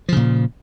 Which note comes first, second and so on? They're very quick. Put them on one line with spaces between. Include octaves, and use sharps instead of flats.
F3 C#3 A#2